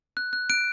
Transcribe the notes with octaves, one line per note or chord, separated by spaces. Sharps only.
F#6
F#6
F#6 D7